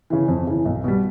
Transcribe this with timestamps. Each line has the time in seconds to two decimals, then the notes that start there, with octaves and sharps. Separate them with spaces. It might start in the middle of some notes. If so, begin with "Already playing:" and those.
0.10 C#3 E3
0.28 F2
0.47 C#3 E3
0.65 B1
0.84 B2 G3